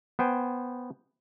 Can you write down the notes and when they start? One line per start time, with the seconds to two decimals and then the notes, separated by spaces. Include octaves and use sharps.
0.19 B3 C5 G5 G#5